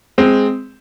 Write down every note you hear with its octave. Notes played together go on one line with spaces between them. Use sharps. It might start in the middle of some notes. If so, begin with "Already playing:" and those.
G#3 C4